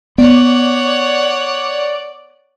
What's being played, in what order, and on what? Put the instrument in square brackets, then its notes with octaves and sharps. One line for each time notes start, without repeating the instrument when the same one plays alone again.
[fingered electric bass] B3 [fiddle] C#5 F#5 [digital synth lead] D5